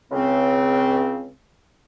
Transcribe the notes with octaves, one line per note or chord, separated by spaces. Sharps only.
C#2 C#3 C4